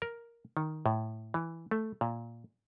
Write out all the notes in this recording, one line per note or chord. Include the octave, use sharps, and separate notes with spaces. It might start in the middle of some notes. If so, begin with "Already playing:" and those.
A#4
D#3
A2
E3
A3
A#2